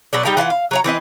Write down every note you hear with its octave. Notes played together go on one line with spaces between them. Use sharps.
B2 F#3 D4
G3 D#4 G5 A#5
E3 F4 E5 F#5
F5
F#3 C#5 A#5
E3 C4 B4 D#5